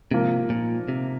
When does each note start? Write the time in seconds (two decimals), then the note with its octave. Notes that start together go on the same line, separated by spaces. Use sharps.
0.11 G#2 C3 F3 A#3
0.50 A#2
0.88 C3